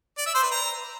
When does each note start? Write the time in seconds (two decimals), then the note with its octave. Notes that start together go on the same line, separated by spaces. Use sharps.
0.18 D5
0.26 E5
0.35 C5
0.43 B4
0.51 A#5